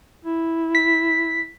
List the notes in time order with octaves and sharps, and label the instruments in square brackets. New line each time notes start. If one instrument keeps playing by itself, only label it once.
[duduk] E4
[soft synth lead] B6